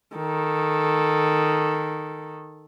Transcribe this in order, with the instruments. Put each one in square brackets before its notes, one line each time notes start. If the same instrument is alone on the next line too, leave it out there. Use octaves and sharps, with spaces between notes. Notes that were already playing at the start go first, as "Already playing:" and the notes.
[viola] D#3 A4